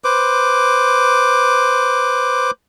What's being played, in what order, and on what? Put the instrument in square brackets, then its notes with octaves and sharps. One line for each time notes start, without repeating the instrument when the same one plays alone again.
[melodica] B4 C5 D6